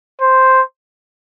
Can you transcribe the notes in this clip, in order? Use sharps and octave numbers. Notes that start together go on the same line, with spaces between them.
C5